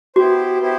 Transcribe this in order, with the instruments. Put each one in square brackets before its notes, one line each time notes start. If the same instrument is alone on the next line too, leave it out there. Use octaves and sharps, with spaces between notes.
[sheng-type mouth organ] B3 E4 G4 C5 [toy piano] F#4
[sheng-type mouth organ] B3 E4 G4 C5